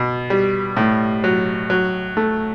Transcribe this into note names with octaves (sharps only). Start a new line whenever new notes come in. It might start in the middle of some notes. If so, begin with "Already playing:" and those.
Already playing: B2
G3
A2
F#3
F#3
A3